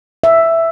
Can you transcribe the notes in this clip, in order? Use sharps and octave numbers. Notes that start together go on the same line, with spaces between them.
E5